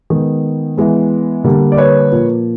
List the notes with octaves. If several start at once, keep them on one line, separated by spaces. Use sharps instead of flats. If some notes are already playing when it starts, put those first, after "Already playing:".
D#3 G#3 B3
E3 G#3 B3
D3 G3 A#3
D5
B4 C#5
A#2 F3 A#3